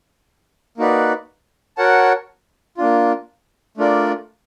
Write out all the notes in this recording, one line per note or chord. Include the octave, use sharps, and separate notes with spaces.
A#3 D#4 F#4 B4 D5
F#4 A#4 C#5 F#5 A5
A#3 D4 F4
A3 D4 F4 A#4 D5